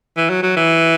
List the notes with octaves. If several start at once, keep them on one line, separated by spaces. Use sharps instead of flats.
E3
F#3
F#3
E3